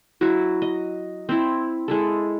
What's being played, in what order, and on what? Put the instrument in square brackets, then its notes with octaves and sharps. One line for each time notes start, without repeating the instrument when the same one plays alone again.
[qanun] F#3 E4 F#4
D#5
C4 E4
G#3 E4 A4